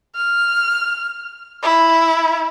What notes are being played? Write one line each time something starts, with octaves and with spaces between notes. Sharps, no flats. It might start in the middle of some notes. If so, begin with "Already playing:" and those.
F6
E4